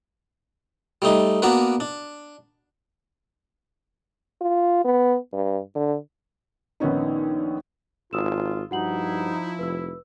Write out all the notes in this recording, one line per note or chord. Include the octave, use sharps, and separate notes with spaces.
G3 A3 D#4
A#3 B3 D4 F#4 A#4 B4
D4
F4
B3
G2
D3
A#1 D#3 B3 C#4 D#4
G#1 F4 D#6 E6 E7
G2 F3 D#4 E4 F#4 F#5 F#7
F1 B4 E6